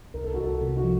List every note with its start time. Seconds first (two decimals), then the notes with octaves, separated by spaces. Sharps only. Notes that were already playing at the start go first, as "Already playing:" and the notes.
0.14 C2 A#4
0.24 A4
0.34 C2 F#4
0.44 A4
0.61 C3 A4
0.77 F#4
0.84 F3